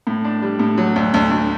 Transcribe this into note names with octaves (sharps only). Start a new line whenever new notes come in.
A2
D4
G3
A2
F#3
D2
D2
D2